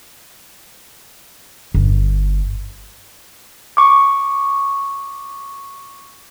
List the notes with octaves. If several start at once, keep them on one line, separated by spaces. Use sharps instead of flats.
G1
C#6 D6